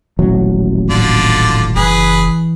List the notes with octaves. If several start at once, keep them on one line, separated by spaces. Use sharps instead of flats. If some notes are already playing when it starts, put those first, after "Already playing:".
D#1 A1 F#3
A2 D3 F4 D5
F#1 E3 G#4 B4